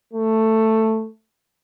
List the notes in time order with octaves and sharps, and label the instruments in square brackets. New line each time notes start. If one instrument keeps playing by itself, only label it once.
[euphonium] A3